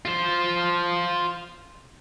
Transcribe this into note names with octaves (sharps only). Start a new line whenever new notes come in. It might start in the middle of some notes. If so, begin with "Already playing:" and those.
F4 C5